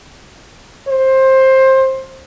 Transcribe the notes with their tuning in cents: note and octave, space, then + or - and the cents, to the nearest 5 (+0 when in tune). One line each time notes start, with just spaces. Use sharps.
C5 +20